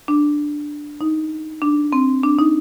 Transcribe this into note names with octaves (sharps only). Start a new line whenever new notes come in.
D4
D#4
D4
C4
D4
D#4